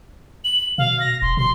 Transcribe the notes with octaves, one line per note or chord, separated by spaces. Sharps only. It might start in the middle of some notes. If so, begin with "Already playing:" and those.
F#7
B2 F5
A#6
E1 C6
B2 C6